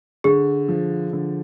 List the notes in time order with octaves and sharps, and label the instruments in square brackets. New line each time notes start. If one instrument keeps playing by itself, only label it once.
[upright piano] D3 [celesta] G#4
[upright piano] F3
D3